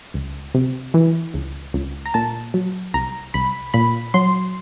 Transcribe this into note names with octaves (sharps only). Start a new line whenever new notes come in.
C#2
C3
E3
C#2
C#2
A#5
A#2 A5
F#3
C2 A#5
C2 B5
A#2 B5
F#3 C6